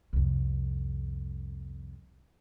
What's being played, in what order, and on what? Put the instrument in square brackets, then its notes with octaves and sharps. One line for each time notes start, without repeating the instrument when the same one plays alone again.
[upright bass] C2 F2